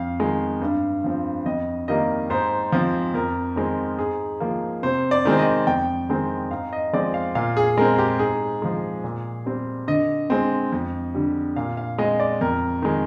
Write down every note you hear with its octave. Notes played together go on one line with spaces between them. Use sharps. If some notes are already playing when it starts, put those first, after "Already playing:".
Already playing: F2 F5
D#3 G#3
G2
F3 C4
F2 D#5
D#3 G3 A#3 D#5
G#2 C5
F3 C4
F2 A#4
D#3 G#3 C4
G#2 G#4
F3 A#3
C3 C5
D5
D#3 G#3 C4
D#5
F2 G5
D#3 G#3 C4
G#2 F5
D#5
F3 G#3 C4 D5
F5
A#2 F5
G#4
G#3 C4 A#4
G4
G#2 G#4
F3 G#3
A#2
G3 C4
D3 D#5
G#3 C4
F2
D3 G3
A#2 F5
F5
G#3 C4 D#5
D5
F2 A#4
D#3 G#3